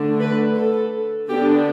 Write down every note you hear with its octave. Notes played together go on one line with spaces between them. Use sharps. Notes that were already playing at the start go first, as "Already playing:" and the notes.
Already playing: D3 A3 D4
B4
A4
D3 B3 D4 G4